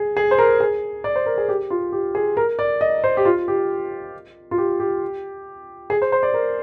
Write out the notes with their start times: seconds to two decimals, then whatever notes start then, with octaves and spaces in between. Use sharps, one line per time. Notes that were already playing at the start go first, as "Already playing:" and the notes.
Already playing: G#4
0.17 G#4
0.31 C5
0.38 A#4
0.60 G#4
1.04 D5
1.16 C5
1.26 A#4
1.38 G#4
1.49 G4
1.70 F4
1.92 G4
2.15 G#4
2.37 A#4
2.59 D5
2.81 D#5
3.04 C5
3.17 G4
3.25 F4
3.48 G4
4.51 F4
4.58 G4
4.80 G4
5.90 G#4
6.02 C5
6.12 C5
6.23 D5
6.34 A#4